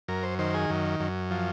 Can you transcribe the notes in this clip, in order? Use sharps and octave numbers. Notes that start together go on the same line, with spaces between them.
F#2 A#4
C5
D#3 C5
G#4
F#2
F#2
F3